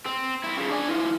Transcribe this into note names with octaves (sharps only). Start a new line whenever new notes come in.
C4
C4 E4
C#3 F3
D4 G#5
E3 F4